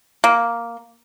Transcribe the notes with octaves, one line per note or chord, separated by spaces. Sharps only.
A#3